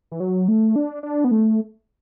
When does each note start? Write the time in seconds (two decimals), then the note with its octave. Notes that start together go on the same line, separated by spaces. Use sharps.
0.12 E3
0.20 F#3
0.48 A3
0.76 D4
1.03 D4
1.24 B3
1.31 A3